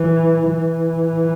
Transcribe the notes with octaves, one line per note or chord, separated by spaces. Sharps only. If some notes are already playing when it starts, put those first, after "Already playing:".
Already playing: E3
E3